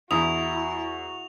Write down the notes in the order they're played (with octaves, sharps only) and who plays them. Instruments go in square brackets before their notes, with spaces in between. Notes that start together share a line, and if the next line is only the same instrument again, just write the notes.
[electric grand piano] E2 D#6 [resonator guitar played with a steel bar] E4 [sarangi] F#4 [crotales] F7